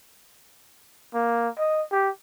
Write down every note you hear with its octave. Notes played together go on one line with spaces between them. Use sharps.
A#3
D#5
G4